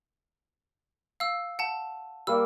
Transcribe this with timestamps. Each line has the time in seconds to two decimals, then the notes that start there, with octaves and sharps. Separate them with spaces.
1.20 F5 E6
1.59 F#5 A5
2.27 G3 A#3 F5 E6